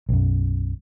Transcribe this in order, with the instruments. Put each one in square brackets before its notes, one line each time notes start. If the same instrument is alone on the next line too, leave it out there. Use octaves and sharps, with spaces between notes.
[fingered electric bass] B1 F#2